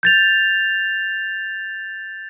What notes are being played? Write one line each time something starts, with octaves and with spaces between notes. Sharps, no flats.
G6 A6 F7